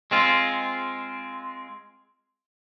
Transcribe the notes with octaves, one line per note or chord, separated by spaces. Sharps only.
G#3 C4 F4